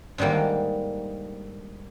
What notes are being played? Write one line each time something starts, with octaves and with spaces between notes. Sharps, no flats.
G#2 D3 D#3 G3 A#3